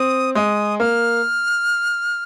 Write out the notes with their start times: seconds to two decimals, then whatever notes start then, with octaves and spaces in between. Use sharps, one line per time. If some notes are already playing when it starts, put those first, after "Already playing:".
Already playing: C4 D#6
0.35 G#3 D#6
0.80 A#3 F6